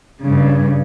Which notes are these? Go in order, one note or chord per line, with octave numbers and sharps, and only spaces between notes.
G2 C#3